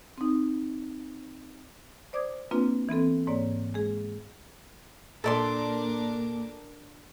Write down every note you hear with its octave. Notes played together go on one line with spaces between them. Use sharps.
C4 D#4
C5 D5 D6 D#6 G#6
A#3 C4 D4 F4 B4
E3 B3 C4 A4
G#2 A#3 C#5 D5
G#3 G#4
A#2 D4 A4 A#4 D5 C6 D6